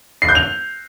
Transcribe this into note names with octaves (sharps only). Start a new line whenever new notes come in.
C7
G6
F7